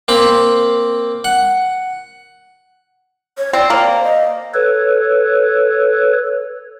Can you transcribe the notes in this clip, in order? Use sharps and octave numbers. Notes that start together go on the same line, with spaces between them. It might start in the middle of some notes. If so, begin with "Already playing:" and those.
A#3 C4 B5
F#5
C#5
C4 D5
A#3
C5
D#5
A4 B4 C#5